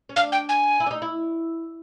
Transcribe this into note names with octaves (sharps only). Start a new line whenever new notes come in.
C#4
D4 F5
G5
G#5
E4
D4
D#4
E4